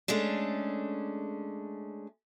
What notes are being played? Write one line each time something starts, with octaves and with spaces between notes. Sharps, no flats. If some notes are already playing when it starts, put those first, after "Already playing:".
G#3 A3 C#4 D4